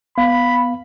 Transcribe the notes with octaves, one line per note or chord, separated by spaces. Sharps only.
B3 F5 B5